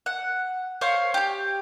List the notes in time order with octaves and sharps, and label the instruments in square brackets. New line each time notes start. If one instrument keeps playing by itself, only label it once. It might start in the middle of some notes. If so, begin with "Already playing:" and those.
[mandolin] F#5
C5 C#5 F5 C#6
G4 G5